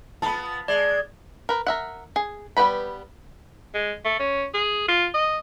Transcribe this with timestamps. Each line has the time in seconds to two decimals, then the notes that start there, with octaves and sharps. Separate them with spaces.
0.22 F3 B3 A5 B5
0.68 G#3 D5 G#6
1.49 A#4 B4
1.67 A#4 E5 F#5
2.16 G#4
2.57 G3 B3 G4 B4 B5
3.74 G#3
4.05 A3
4.19 C#4
4.54 G#4
4.88 F4
5.14 D#5